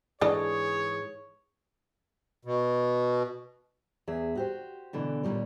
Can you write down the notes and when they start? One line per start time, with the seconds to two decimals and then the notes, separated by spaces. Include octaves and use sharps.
0.21 G#2 E3 D4 G#4 A4 C#5 D#5
2.45 B2
4.07 E2 G#4 E5
4.35 F#4 G4 C5
4.93 B2 D3 E3
5.23 D#2 A#2 F#3 G3 C#5